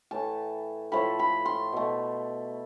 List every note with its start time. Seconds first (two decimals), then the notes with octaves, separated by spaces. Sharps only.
0.11 A2 E3 A3 A5
0.92 A2 F3 A3 B5
1.19 B5
1.45 C6
1.72 B2 A3